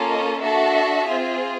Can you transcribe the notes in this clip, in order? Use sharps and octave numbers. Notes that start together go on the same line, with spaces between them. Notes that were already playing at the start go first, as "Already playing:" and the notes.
Already playing: A#3 C#4 F4 A4
D#5
D4 F#4 A4 E5
C4 F4 G#4